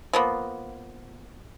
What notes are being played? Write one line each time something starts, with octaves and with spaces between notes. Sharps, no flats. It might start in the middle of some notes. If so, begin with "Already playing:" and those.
F3 A#3 B3